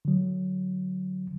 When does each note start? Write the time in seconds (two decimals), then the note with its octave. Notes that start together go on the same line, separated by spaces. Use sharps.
0.05 D3 F#3